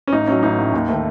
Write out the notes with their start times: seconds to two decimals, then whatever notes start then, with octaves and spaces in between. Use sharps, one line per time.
0.07 C#4
0.12 A1 D#4
0.27 A2 F#3 C#4
0.43 A1 D#4
0.59 A2 F#3
0.73 D#2
0.89 D#3 A3